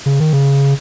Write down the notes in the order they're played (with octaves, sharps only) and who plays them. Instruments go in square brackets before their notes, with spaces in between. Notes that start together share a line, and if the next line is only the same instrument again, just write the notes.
[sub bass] C#3
D#3
C#3